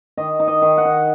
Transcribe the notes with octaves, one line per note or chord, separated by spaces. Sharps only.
D#3 D#5
D#4
D#5
D#3
F#5
D#4